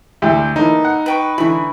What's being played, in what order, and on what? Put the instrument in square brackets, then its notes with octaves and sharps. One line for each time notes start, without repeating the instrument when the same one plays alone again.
[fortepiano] D2 E4 G4
[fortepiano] E3 A#3 [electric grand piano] D#4 [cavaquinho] A4
[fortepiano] F#5
[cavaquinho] B4 G5 C#6
[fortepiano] D3 E3 [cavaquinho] B5 C#6